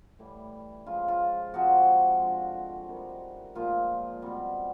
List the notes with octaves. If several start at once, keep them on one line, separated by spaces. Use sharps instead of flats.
A2 E3 G3
C#3 F3 G#3 F4
F4
C3 F3 G#3 F#4
D3 F3 G#3
C3 D#3 G3
A#2 F3 G#3 F4
B2 G3 C4